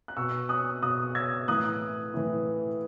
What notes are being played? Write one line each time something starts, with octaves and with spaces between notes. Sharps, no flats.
F#6
B2 C#6 E6
D#6 F#6
B2 D#6 F#6
E6 G#6
A2 E3 D#6 F#6
A2 E3